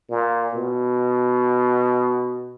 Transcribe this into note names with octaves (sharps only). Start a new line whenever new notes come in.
A#2
B2